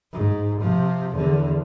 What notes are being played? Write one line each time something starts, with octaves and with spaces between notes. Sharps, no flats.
G#2
C3 F3
E2 D3